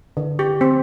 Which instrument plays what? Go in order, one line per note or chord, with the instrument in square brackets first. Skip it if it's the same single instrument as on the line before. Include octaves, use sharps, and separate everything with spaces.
[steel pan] D3
G4
C4